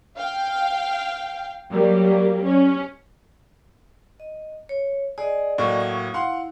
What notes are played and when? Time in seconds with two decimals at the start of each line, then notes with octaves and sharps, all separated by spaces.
0.18 F5 G5
1.71 F#3 G3 A#3
2.44 C#4
4.20 D#5
4.69 C#5
5.18 G#4 D5 D#5
5.58 A2 F#3 A#3
5.80 C#6 D#6
6.14 E4 F5 F#5 C6